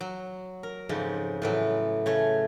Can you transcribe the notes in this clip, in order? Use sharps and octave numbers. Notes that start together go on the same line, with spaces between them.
F#3
A#4
F2 G#2 C#3
A2 E3 F#3
C#3 A3 C#5